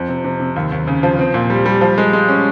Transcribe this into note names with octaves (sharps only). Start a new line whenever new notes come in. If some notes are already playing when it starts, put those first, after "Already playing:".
Already playing: F2
C3
C3
C3
D#2
D#2
C#3
F3
C4
A#2
G3
G3
F3
G#3
G#3
C#4